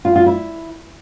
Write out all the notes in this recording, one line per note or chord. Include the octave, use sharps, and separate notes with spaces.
F4
F4
E4